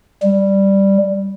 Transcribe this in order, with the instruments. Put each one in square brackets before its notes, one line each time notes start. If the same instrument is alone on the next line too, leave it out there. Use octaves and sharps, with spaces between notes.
[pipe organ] G3